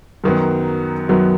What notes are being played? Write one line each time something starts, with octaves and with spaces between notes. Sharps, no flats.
F#2 D#3 F#3 B3
F#2 D#3 F#3 B3